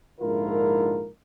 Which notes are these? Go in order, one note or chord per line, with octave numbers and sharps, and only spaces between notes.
A#1 G#2 D3 E4 F4 A#4